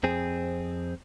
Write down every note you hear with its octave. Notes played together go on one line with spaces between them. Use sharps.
F2 C4 G#4